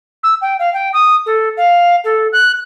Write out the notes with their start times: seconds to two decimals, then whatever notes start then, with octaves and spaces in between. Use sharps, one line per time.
0.23 E6
0.41 G5
0.59 F5
0.73 G5
0.93 D#6
1.26 A4
1.57 F5
2.04 A4
2.32 F#6